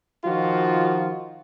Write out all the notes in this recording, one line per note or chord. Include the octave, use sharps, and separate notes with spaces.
D#3 F3 F4 F#4